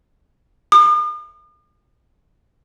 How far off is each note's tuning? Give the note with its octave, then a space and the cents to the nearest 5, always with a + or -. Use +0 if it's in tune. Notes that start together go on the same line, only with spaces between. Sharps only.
D#6 -45